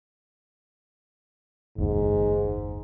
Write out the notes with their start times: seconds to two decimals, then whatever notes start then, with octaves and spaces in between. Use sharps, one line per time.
1.78 F#1 D#2 G#2